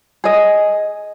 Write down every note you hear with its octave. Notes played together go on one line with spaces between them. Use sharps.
G#4 D#5